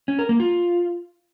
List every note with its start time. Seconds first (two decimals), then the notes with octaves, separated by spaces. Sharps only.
0.08 C#4
0.19 A#4
0.29 A#3
0.40 F4